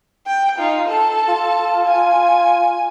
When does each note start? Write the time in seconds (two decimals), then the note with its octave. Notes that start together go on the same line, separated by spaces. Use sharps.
0.27 G5
0.58 D#4 F4
0.88 A4 A5
1.28 F4
1.87 G#5